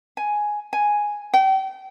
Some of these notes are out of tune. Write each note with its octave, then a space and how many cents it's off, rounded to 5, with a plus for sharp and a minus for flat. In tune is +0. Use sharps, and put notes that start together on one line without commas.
G#5 +5
G#5 +0
G5 -35